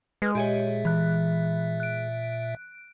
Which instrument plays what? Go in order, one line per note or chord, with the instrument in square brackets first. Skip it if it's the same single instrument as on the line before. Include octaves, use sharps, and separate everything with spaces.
[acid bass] G#3 [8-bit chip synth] B4 F6
[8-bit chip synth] A#2 E5 [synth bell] G4 G#4 C#5
[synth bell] E3 F#6
F#6 D7